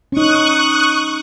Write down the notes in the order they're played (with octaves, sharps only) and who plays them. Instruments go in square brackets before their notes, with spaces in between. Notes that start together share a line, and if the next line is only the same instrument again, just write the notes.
[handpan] C#4 D#4 [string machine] C#6 D#6 F#6